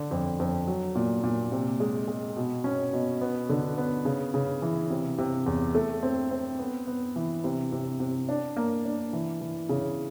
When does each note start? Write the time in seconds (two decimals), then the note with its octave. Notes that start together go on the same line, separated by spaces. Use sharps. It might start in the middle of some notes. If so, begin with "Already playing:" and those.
Already playing: D3
0.11 F2
0.40 F2
0.67 F#3
0.95 A#2
1.24 A#2
1.52 C3
1.80 G#3
2.08 G#3
2.36 B2
2.64 C#4
2.93 B2
3.21 B3
3.49 D3
3.78 B3
4.05 C#3
4.34 C#3
4.62 E3
4.90 C3
5.18 C3
5.46 E2
5.75 A3
6.03 C4
6.31 C4
6.59 B3
6.88 B3
7.16 E3
7.44 C3
7.72 C3
8.00 C3
8.29 D4
8.56 A#3
8.85 D4
9.13 E3
9.41 E3
9.69 C#3